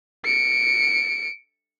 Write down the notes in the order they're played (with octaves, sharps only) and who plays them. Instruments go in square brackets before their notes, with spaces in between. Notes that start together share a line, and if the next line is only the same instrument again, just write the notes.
[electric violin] C#7 D7